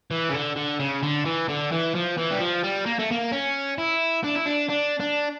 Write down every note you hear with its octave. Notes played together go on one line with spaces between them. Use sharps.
E3
C#3
D3
D3
C#3
D3
E3
D3
E3
F3
E3
G3
F3
G3
A#3
A3
A#3
C#4
E4
D4
E4
D4
D4
D4